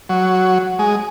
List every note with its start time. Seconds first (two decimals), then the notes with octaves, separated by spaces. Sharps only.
0.09 F#3
0.79 G#3